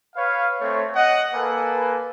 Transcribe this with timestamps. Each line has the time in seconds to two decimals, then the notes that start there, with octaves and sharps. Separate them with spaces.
0.16 B4 C#5 F5
0.61 A3 C4 C#5
0.95 D#5 F#5
1.34 A#3 A4 B4 G#5